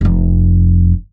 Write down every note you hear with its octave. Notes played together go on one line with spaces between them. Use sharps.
F1 F2